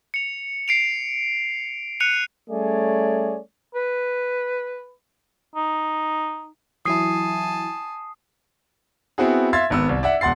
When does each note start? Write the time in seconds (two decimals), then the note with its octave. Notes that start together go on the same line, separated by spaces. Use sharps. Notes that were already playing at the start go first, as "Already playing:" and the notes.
0.14 C#7 F7
0.68 C7 D7 F7
2.00 F#6 C#7 D#7 F7
2.50 G3 A3 C#4 G#4 C#5 D5
3.74 B4
5.55 D#4
6.85 E3 F#3 E4 G#5 A5 D#6 C7
9.18 B3 C4 E4 F#4 G#4
9.53 E5 F5 C6 G#6 A6
9.70 G#1 B3 E6
9.89 C2
10.03 D5 E5 F#5
10.21 E1 F#5 C6 A6 C7